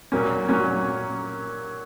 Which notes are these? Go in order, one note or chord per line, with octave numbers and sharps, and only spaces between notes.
A#2 F#3 A#3 C#4
A#2 F#3 A#3 C#4